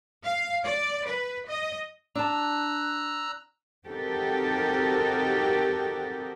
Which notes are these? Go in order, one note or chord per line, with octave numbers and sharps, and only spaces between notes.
F5
D5
B4
D#5
D4 A5 A#5 E6 F#6
C4 D#4 F#4 G4 A4 A#4